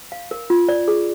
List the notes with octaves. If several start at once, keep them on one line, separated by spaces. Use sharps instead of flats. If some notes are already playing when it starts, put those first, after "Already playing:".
F5
A#4
F4
D5
G#4